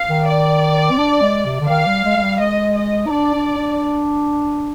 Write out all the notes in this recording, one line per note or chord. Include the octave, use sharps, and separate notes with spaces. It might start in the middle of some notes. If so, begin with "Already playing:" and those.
Already playing: F5
D#3
D5
C4
D4
G#3
C3
D3
D#3 F5
G3
G#3
G#3
G3
G#3 D#5
D#5
D#4
D4 D5
D4
D4